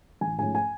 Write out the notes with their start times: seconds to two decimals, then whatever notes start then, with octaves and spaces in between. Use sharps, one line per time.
0.21 A1 G#5
0.38 G#2 F3 A3 C#4 G#5
0.55 G#5